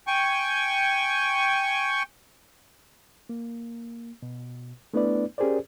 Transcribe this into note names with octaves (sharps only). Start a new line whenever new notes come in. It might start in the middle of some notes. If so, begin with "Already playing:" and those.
G5 G#5 C#6
A#3
B2
A3 B3 D4 E4 B4 D5
C#4 G4 G#4 A#4 C5 D5